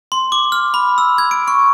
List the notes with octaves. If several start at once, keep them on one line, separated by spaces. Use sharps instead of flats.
C6
D6
F6
B5
E6
G#6
D7
C#6